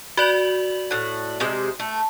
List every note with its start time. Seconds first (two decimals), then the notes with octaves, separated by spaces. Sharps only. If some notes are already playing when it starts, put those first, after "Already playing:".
0.17 F#4 B4 D5 F#5 F#7
0.91 A2 F#5
1.40 C3 G#3 C5
1.80 A3